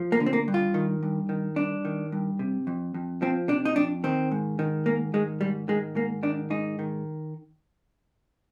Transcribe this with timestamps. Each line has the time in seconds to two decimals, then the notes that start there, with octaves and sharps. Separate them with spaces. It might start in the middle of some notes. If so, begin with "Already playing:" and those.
Already playing: F3
0.12 A#3
0.20 D3
0.26 C4
0.33 A#3
0.48 G2
0.54 F4
0.74 D#3
1.03 G2
1.29 D#3
1.56 G2 D4
1.85 D#3
2.12 G2
2.39 C3
2.67 F2
2.94 F2
3.22 F3 C4
3.48 C3 D4
3.65 D#4
3.76 F2 D4
4.04 D#3 C4
4.32 G#2
4.59 D#3
4.86 G#2 A#3
5.14 D#3 G#3
5.41 G#2 G3
5.68 D#3 G#3
5.95 G#2 A#3
6.23 D#3 D4
6.50 G#2 D#4
6.79 D#3